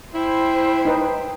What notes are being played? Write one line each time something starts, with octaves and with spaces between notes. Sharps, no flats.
E4 C5 G5
D#4 B4